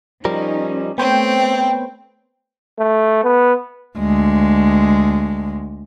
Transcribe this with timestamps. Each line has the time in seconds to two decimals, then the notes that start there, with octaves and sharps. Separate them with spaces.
0.25 F3 G3 C#4 D#4 A#4
0.98 A3 B3 C4 C5 C#5 G5
2.79 A3
3.24 B3
3.98 D2 G#3